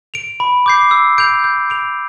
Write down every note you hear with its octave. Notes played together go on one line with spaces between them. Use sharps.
D7 F7
B5
D6 G6 C7
E6
G6 D7 F7
G6
D7 F7